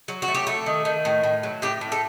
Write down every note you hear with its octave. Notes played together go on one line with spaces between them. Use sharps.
F#3
F#4
A3
G4
A3 A4
D#3
D#3
A2
A2
F#3
A2 G4
A2
A4